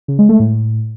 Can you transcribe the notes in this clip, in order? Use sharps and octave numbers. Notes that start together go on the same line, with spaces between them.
C#3
G#3
A3
A2